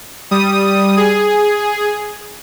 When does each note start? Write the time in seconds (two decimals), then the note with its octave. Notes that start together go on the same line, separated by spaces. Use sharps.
0.31 G3 D#6
0.97 G#4